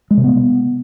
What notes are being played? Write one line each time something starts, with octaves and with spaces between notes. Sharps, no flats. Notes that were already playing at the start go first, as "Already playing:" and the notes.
G#3
C3
B3